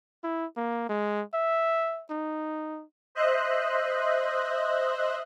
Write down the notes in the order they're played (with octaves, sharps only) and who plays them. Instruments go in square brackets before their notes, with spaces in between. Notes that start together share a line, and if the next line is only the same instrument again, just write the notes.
[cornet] E4
A#3
G#3
E5
D#4
[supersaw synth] C5 D#5 E5 F#6